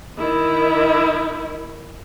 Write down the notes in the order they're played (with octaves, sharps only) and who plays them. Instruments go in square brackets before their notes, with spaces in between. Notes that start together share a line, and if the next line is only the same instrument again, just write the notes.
[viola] D#3 E4